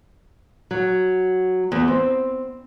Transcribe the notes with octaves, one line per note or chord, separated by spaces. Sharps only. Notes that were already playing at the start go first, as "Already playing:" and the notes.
F#3
E2
C4